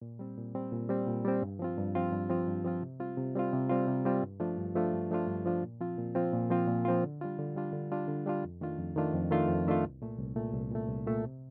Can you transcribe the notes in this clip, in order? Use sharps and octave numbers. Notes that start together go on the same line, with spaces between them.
A#2
G3 C4
A#2
G3 C4
A#2
G3 C4
A#2
G3 C4
G2
F3 C4 F4
G2
F3 C4 F4
G2
F3 C4 F4
G2
F3 C4 F4
C3
G3 C4 F4
C3
G3 C4 F4
C3
G3 C4 F4
C3
G3 C4 F4
G2
F3 A3 D4 F4
G2
F3 A3 D4 F4
G2
F3 A3 D4 F4
G2
F3 A3 D4 F4
A#2
F3 C4 F4
A#2
F3 C4 F4
A#2
F3 C4 F4
A#2
F3 C4 F4
D3
G3 D4 F4
D3
G3 D4 F4
D3
G3 D4 F4
D3
G3 D4 F4
F2
D#3 A3 D4 F4
F2
D#3 A3 D4 F4
F2
D#3 A3 D4 F4
F2
D#3 A3 D4 F4
C2
A#2 A3
C2
A#2 A3
C2
A#2 A3
C2
A#2 A3
C3